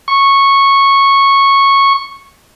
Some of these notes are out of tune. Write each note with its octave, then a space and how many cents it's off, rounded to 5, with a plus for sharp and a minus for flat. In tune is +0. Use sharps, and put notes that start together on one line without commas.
C#6 -10